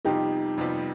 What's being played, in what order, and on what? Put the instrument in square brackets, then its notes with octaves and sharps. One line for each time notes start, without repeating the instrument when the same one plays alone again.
[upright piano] F2 C3 G3 B3 F4 [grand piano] D#4 G4
[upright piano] F2 C3 G3 B3 F4